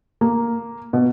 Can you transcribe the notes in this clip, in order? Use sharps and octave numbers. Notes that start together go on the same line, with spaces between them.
A#3
B2